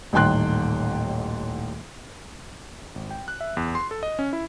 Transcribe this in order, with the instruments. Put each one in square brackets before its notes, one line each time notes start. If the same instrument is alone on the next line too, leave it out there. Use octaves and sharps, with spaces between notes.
[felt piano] D#1 A1 D#3 G5 C6 F#6
[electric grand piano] G#1
G5
F#6
E5
E2
C6
A4
D#5
C#4
E4